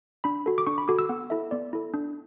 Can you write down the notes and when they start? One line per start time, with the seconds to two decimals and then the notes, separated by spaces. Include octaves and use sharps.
0.24 D4 B5
0.46 F#4 A4
0.58 D6
0.67 D4 C#6
0.78 B5
0.88 F#4 A4 D6
0.99 E6
1.09 B3 F#5
1.30 E4 A4 E5
1.51 B3 D5
1.73 E4 A4
1.94 D4